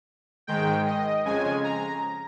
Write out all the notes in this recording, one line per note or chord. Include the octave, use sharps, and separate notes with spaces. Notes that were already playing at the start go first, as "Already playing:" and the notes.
G#2 D#3 G#3 G5
D#5
F2 C#3 G#3 G#5
A#5